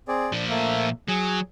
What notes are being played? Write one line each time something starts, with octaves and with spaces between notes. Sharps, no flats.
C4 G#4 D5
A#2 F3 D4
A3 A#3 E5
F#3 G#4